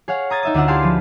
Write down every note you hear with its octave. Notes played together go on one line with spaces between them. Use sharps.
G#4 C#5 F5 F#5
A#5 D#6 G#6 A6
D#4 E5 D#6
D2 C#4 D4 F4 F#5 E6
E4 G4 G#4 F5 A5 C6
F3 B4